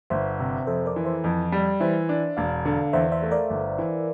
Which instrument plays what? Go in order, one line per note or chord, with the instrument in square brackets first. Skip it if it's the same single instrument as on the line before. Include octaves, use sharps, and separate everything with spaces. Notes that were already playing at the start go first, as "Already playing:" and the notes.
[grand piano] G1 [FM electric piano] C5 E5
[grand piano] C3
[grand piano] F2 [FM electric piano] A4 C5
[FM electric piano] A#4 D5
[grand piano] E3
[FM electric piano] C5 E5
[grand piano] F2
G3
[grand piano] E3 [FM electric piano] C5 E5
[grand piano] D4
[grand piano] E1 [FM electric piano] D5 F5
[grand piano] D3
[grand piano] E2 [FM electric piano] C5 E5
[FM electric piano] C5 E5
[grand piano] A3
[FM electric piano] A#4 D5
[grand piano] G1
E3